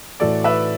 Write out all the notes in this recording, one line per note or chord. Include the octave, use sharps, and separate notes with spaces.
A2 E3 A3 F#4 A4 D5
B4 E5